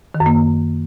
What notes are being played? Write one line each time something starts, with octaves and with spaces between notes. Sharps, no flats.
D#3
F#2
A#3